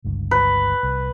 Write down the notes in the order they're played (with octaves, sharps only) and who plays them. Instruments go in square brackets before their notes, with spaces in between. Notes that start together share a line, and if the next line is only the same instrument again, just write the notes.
[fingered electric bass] G1 C#2 G2
[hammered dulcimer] B4
[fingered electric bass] C2